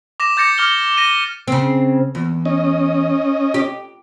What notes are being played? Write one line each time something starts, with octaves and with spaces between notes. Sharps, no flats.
D6 A#6 E7
D6 G6 A6 A#6 C#7
D6 F6 G7
A#6 D#7
C#3 C4
E2
C#4 D#5
G4